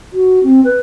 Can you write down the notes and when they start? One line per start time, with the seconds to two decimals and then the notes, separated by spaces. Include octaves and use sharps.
0.13 F#4
0.43 C4
0.65 B4